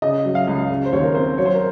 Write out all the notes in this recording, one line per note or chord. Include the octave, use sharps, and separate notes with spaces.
C#3 D#5
F#3
F5
C#2
C#3
C5
D#2 C#5
A#4
C4 C5
F#3 C#5
C5
A#4